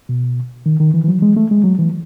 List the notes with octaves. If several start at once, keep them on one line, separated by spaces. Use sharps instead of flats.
B2
D#3
D#3
E3
E3
F#3
G#3
A3
G#3
F#3
E3